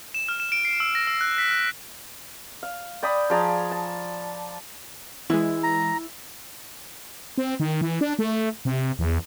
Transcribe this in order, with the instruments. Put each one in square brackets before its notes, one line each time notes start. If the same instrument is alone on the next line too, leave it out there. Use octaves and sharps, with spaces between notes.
[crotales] E7
F6
E7
D7
C7
E6
A#6
E6
F#6
B6
F#6
[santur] F5
D5 G5 B5 D#6
F3 G#4 D5 A#5
A5
[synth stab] E3 G#3 [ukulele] E4
[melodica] A#5
[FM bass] C4
D#3
E3
D4
A3
C3
E2